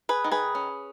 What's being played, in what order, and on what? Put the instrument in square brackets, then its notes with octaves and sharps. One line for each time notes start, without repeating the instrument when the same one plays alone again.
[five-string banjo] G#4 B4
D#3
G#4 B4
C#4